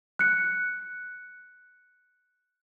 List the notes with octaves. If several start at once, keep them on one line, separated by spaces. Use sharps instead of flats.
F#6 C#7